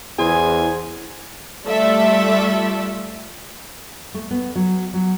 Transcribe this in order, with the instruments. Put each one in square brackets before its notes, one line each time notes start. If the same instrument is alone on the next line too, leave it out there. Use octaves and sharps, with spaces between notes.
[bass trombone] E2 [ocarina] E4 [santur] G#4 C5 [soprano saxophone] G#5
[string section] G3 A3 F4 A4 D5 E5
[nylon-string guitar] A3
B3
F#3
F#3